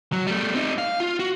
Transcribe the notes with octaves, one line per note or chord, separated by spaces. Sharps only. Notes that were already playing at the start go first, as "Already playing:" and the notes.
F#3
G3 A3
C4 D#4
F5
F4
F#4